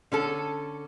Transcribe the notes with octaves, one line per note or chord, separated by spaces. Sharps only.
D3 C#4 A4